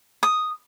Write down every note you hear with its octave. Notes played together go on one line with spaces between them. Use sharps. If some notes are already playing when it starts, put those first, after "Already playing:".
D#6